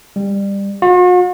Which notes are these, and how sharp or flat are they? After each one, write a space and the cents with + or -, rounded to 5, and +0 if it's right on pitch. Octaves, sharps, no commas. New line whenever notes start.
G3 +20
F#4 -45